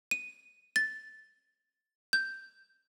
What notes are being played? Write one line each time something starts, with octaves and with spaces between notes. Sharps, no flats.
D#7
A6
G6